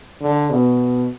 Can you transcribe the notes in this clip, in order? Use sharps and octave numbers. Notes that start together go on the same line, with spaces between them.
D3
B2